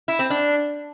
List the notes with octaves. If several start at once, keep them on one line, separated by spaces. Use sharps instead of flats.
E4
C4
D4